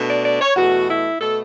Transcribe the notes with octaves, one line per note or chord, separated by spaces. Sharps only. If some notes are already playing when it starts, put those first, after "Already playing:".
Already playing: B2 A3 D4
D5
D5
C#5
E2 B2 A3 F#4
E4
B2 A3 A4